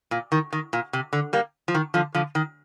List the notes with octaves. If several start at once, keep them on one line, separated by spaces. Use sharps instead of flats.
A#2
D#3
D#3
A#2
C3
D3
G3 A#3
F3
D#3
D3 F3
D3 F3
D#3